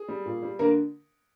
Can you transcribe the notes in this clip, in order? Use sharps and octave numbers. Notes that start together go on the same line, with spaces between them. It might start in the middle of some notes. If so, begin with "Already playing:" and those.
Already playing: G#4
G3
A#2
G3
D3 A#3 A#4